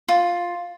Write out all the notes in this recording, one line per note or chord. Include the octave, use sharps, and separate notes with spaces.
F4